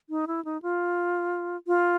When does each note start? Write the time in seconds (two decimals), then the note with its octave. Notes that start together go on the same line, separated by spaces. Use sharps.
0.10 D#4
0.27 E4
0.45 D#4
0.62 F4
1.67 F4